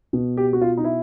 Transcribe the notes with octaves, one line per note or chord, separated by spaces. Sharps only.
B2
G4
F#4
F4
D#4
E4